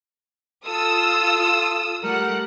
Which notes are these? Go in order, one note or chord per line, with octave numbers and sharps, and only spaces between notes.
F4 A4 D#6 E6
G3 A3 A#4 F#5